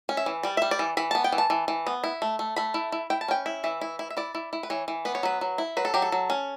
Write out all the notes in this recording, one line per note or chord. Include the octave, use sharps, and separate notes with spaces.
C#4
E5
E3
G3 D5
G3 E5
D5
E3
E3 B5
B3 A5
G5
E3
A5
E3
E3
B3
E4
A3
A3
A3 B5
E4
E4
E4 G5
A5
C#4 G5
E4
E3 E5
E4
E4
E5
E4 D5
E4
E4
B4
E3 C#5
E3
B3 B4
C#5
F#3 B4
F#3
E4
F#3 B4
A4
F#3 G4
A4
F#3
C#4